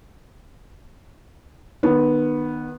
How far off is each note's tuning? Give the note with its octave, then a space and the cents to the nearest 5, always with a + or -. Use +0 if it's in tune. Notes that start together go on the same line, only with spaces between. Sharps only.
D#3 -35 B3 -10